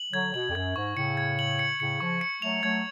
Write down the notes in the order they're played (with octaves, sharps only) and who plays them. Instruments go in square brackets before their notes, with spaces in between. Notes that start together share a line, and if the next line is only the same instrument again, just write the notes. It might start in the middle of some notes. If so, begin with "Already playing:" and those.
Already playing: [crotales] F#7
[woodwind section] D3 F#3 [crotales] G#6
[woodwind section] B2 [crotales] F#7
[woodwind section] F2
[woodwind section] F#2 [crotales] G#6
[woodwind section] G#2 [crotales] C#6
[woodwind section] A2 C#3 [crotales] C#7
[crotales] G#6
F#7
C#7
[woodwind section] A2 C#3 [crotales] C#7
[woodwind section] C#3 F3 [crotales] C#6
[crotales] C#7
[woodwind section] F#3 A3 [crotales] F7
[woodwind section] F#3 A3 [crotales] G#6